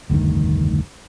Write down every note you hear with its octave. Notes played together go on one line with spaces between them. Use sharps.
F1 D2 G2 D#3